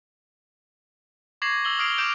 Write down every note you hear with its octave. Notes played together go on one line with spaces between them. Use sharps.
C#6 D6 G#6 A#6 C7 F#7
E6 A#6 F#7 G7
D#6 F6 C7 D7 F7
D6 F6 G6 D7 F7